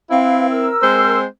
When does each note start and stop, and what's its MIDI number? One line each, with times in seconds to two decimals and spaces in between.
0.10 0.69 60
0.10 0.69 64
0.10 0.49 71
0.10 0.49 77
0.49 1.19 70
0.49 1.19 88
0.82 1.25 56
0.82 1.25 60
0.82 1.25 72